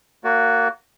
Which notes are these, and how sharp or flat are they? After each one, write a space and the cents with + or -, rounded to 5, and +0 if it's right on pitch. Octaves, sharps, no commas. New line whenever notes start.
A#3 -20 F#4 +0 D5 -35